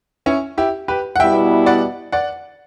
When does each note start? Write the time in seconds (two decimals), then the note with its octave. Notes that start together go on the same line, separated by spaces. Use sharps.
0.26 C#4 E4
0.58 E4 G4
0.88 G4 B4
1.16 F#5
1.19 B2 G3 B3 E4 E5 G5
1.66 D5 F#5
2.12 D5 F#5